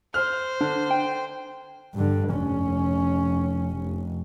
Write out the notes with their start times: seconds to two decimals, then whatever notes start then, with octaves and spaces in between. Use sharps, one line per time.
0.14 C5 F6
0.61 D3 D4
0.91 G5
1.95 G2 D3
2.31 F1 C#4
3.78 F1